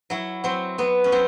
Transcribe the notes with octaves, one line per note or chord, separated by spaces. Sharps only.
F#3 E4
F#3 C4
F#3 B3
C#4
F#3 C4